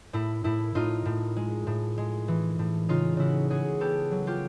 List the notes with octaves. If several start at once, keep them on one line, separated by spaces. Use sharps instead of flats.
A2 E4
A2 E4
A2 D#4 F4
A2
G#3
A2
G#3
E3
A2
C#3 D#4 F4
C#3 E4 F#4
C#3 F#4 G#4
B3 G4 A4
F#3
F4 G4